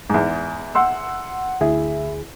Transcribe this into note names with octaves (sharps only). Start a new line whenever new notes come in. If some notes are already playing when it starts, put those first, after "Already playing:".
E2 G#2
F#5 C6 E6
D2 E4 G#4